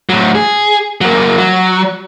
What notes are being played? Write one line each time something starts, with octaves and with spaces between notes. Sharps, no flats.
A2 F#3
G#4
F#3 A#3
F#3